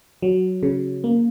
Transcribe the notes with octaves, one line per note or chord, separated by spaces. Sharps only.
F#3
C#3
A#3